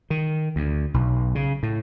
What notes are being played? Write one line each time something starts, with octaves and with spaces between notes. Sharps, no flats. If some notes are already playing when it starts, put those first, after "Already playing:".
D#3
D2
B1
C#3
A2